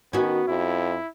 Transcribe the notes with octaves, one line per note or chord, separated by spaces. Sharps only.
D#3 B3 C#4 F#4
F2 E4